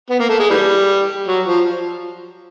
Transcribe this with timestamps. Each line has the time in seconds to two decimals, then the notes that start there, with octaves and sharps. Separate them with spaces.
0.10 B3
0.20 A#3
0.29 A3
0.39 G#3
0.50 E3 G3
1.27 F#3
1.47 F3